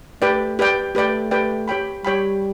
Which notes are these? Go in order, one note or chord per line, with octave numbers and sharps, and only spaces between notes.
A3 G4 B4 D5 G5
G4 B4 D5 G5
A3 G4 B4 D5 G5
G4 B4 D5 G5
G4 C#5 G5 B5
G3 G4 C#5 G5 B5